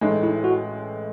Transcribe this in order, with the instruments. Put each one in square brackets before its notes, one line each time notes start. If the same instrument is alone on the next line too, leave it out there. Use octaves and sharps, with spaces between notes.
[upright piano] A1 A2 G#3 [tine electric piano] D#4
[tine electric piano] E4
F#4